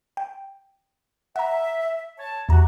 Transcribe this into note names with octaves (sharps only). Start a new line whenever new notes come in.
G5
E5 F#5 A#5
C#5 A5
E2 C3 F#4 A#5